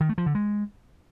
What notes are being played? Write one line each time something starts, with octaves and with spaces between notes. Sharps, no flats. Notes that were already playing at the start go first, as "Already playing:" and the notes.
D#3
A3
F3
D3
G#3